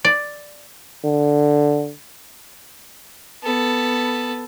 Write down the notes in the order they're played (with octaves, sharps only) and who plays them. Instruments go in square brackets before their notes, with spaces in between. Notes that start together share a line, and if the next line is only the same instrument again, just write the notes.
[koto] D5
[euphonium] D3
[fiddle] B3 A4